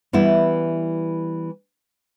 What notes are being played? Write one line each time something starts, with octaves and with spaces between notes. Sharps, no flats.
E3 G3 B3 E4